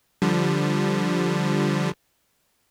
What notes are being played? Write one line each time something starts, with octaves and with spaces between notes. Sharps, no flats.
D3 F3 G3